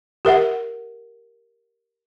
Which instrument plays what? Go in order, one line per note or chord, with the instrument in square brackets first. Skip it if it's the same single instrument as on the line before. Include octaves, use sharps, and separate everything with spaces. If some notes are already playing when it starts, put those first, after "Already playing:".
[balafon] G4 A#4 E5 F#5